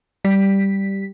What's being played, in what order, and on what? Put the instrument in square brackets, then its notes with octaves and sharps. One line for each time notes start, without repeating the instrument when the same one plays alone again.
[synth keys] G3 B6